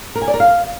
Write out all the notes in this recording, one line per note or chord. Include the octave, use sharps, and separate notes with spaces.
A#4
G#5
D5
A#4
F5